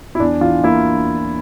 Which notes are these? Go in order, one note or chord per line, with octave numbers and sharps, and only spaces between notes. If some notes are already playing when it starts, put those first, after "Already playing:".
E4
E2 D4
E3 F4
A#3 E4